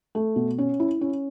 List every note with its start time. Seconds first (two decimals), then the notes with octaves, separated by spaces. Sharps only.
0.15 A3
0.36 B2
0.58 C#4
0.80 E4
1.01 C#4